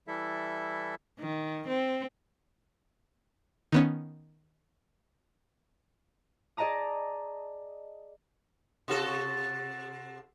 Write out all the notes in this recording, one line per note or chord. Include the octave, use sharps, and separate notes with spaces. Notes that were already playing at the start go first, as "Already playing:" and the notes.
E3 G3 E4 A4 E5
D#3
C4
D#3 B3 C#4
G#4 D5 D#5 A5 A#5 D#6
C3 F#4 A4